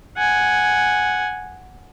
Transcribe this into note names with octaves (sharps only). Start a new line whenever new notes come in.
F#5 G#5